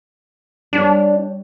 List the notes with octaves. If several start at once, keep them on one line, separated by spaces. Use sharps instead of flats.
G3 D4 C#5